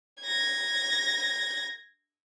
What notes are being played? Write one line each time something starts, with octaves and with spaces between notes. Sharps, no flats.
G#6 A#6